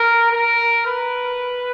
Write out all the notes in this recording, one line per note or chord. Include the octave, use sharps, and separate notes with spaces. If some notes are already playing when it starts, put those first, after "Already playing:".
Already playing: A#4
A#4
B4